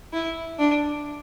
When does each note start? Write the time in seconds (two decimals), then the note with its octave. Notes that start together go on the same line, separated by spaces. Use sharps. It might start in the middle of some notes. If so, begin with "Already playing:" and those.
0.13 E4
0.59 D4